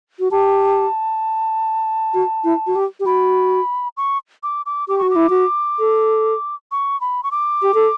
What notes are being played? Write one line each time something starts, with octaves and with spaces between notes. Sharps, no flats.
F#4
G4 A5
F#4
E4
F#4
G4
G4
F#4 B5
C#6
D6
D6
G4 D6
F#4 C#6
D6
E4
F#4
A4
C#6
B5
C#6
D6
G4
A4